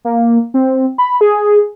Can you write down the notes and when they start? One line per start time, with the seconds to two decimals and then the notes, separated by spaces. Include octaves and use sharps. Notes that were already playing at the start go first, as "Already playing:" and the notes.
0.05 A#3
0.54 C4
0.98 B5
1.21 G#4